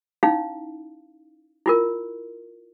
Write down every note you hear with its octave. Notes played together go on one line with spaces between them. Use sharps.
C#4 D#4 E4 F5
E4 F4 A#4